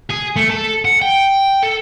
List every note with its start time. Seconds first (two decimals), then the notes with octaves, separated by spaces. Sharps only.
0.10 G#4
0.36 A3
0.50 A4
0.85 F#5
1.02 G5
1.63 A4